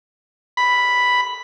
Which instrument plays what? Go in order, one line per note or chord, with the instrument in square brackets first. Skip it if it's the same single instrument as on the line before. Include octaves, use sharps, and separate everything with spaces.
[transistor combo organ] B5